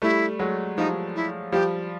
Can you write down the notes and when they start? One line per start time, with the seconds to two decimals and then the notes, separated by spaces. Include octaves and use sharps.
0.02 G3 A3 E4
0.39 F#3 G#3
0.77 F3 G3 D#4
1.15 E4
1.52 F3 G3 G4